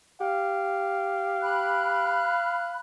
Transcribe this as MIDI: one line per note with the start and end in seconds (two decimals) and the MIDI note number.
0.21 2.33 67
0.21 2.79 77
1.42 2.80 83
1.42 2.80 90